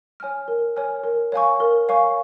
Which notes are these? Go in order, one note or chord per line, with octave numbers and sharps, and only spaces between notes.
C#5 G#5 F6
A#4
C#5 G#5 F6
A#4
C#5 F5 G#5 C#6
A#4
C#5 F5 G#5 C#6